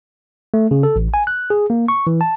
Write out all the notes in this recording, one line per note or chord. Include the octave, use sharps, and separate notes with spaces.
A3
C#3
A4
A1
G#5
F#6
G#4
A#3
C#6
E3
A5